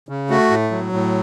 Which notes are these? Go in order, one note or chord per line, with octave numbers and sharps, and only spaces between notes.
C#3
A3 F#4
A2
F#3
A2